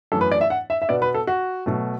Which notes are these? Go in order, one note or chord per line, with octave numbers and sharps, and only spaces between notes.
F#2 E3 A3 A4
B4
D5
E5
F#5
E5
E5
B2 B3 D5
B4
A4
F#4
B2 F#3 A3